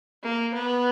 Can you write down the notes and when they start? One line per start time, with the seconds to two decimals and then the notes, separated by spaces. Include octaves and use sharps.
0.23 A#3
0.54 B3